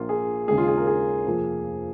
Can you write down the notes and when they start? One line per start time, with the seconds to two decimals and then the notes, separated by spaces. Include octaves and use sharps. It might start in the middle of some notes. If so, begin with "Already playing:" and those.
Already playing: A#1 A#2 A#3 F4
0.09 G#4
0.48 D#2 C#3 G#3 G#4
0.58 F4
0.68 G#4
0.77 A#4
0.87 G#4
1.26 F1 F2 F3 A#3